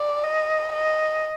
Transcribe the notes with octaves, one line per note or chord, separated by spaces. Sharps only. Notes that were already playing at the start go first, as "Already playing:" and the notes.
Already playing: D5
D#5
D#5